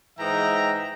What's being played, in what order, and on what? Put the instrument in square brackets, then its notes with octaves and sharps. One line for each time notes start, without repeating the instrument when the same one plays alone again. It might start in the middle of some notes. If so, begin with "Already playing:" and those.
[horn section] G#2 E3 D#5 E5 G5 A#5